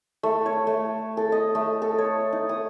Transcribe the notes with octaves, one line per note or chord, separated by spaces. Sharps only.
A3
C#5
A3
A4
D#5
A3
A4
C#5
D#4
D#6